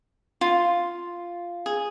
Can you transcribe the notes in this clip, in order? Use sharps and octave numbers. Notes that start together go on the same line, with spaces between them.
F4
G#4